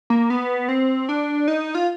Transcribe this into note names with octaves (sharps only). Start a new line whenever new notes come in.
A#3
B3
C4
D4
D#4
F4